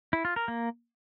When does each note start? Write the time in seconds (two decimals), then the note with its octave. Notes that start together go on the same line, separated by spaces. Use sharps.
0.13 E4
0.25 F4
0.36 A#4
0.48 A#3